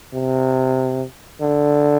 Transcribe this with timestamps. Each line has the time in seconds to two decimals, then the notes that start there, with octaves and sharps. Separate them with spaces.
0.13 C3
1.41 D3